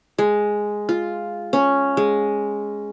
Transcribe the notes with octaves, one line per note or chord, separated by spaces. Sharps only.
G#3
F4
C#4
G#3